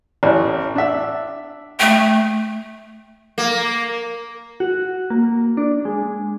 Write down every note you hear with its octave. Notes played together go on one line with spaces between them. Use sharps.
A1
D4 E5
A3 G5
A#3
F#4
A#3
D4
G#3